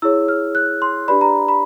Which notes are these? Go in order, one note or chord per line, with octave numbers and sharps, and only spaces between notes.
E4 G#4 C#5 E6
F6
F#6
C6
D4 G4 B4 D5 B5
A#5
B5